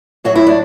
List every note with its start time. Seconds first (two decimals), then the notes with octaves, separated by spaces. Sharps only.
0.24 A2 F#3 F#4
0.35 E4
0.47 D4